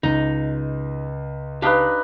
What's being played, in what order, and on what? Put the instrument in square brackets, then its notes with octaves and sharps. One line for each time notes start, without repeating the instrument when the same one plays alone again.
[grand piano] C#2 [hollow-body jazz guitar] D#4
[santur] D4 D#4 B4 [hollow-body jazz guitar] G4 F5